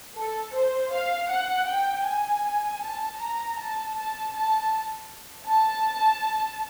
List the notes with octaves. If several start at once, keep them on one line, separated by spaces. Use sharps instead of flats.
A4
C5
F5
F#5
G5
G#5
A5
A#5
A5
A5
A5
A5